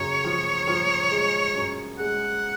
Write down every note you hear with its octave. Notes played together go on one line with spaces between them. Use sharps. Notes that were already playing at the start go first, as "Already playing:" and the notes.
Already playing: F#2 C#3 C#5
F3
F3
G#3
F#2
G#3 F#5